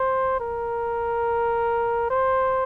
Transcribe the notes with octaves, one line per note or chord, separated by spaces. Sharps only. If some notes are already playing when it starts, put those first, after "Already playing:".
Already playing: C5
A#4
C5